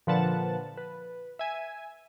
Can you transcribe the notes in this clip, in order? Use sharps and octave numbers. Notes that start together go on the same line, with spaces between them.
A#2 D3 F3 B4 F#5 A5
B4
E5 G#5